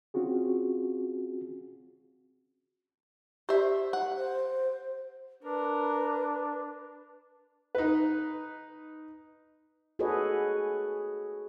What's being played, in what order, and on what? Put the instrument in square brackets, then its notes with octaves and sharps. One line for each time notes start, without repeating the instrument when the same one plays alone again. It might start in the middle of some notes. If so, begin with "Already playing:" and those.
[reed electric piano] C4 C#4 F4 F#4 G#4
[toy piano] G4 D5 [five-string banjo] C5 E5
[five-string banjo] F#5
[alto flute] C5
[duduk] D4 [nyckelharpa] A#4 [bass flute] B4
[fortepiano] D#4 B4
[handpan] F#4 G#4 A4 B4 C#5 D#5